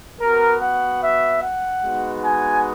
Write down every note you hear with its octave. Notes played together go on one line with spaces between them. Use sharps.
B3 F#4 A#4
F#5
E5
F#5
G#3 B3 D#4 F#4
G#5